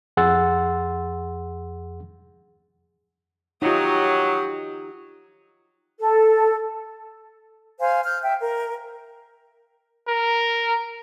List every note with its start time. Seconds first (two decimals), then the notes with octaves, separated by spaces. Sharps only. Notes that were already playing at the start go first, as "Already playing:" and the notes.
0.17 F2 G#4 F#5 C6 E6 A6
3.62 F#3 D#4 F4 G4 D#6
6.00 A4
7.80 C5 F5 G#5
8.04 F6 G6
8.23 E5 G5
8.41 A#4
10.08 A#4